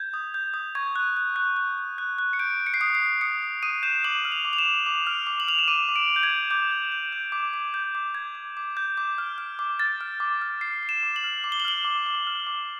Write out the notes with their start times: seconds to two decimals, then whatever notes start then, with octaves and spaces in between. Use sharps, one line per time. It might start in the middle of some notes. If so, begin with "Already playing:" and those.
Already playing: G6 G#6
0.14 D#6
0.34 G6
0.54 D#6
0.75 C#6 G#6
0.96 F#6
1.17 F#6
1.36 F#6
1.56 F#6
1.78 F#6
1.98 F#6
2.19 F#6
2.33 C#7
2.39 G6 D7
2.60 G6
2.67 C#7
2.74 C7
2.81 D#6 C#7
2.95 C7
3.01 D#6
3.21 D#6 C#7
3.43 D#6
3.63 D#6 D#7
3.83 G6 E7
4.04 D6 F#7
4.25 F6
4.32 F7
4.45 D6
4.53 F7
4.58 E7
4.66 D6
4.86 D6
5.07 F6
5.27 D6
5.40 F#7
5.48 F6 F7
5.59 E7
5.68 D6 D#7
5.89 D6
5.96 D7
6.10 D6
6.16 G6
6.23 G#6
6.30 G6
6.51 D6 G6
6.71 G6
6.92 G6
7.12 G6
7.32 D6
7.54 D6
7.74 G6
7.95 D6
8.15 D6 G#6
8.35 D6
8.57 D6
8.77 G6
8.97 D6
9.18 F6
9.38 F6
9.59 D6
9.80 F6 A6
10.01 F6
10.20 D6
10.42 F6
10.61 F6 C7
10.83 F6
10.89 E7
11.03 D6
11.16 F#7
11.24 F6
11.44 D6
11.52 G7
11.60 F#7
11.65 F6 G7
11.85 D6
12.06 D6
12.27 F6
12.47 D6